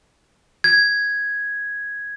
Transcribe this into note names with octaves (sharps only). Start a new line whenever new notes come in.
G#6